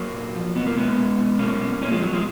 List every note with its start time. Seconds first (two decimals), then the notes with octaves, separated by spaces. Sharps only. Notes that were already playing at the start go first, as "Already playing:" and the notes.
Already playing: F#3 A#3
0.13 A#2
0.34 F3
0.55 B2 B3
0.67 A#3
0.77 B2 G#3 B3
0.97 B2
1.18 B2
1.39 B2 A#3 C#4
1.60 B2
1.81 B2 A#3 C#4
1.92 F3 G#3
2.02 B2 F#3
2.13 F3 G#3